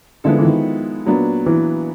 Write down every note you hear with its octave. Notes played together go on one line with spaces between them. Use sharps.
D3 F3 G#3 B3 E4 A4
E3
D#3
A#2 F#3 B3 D4
E3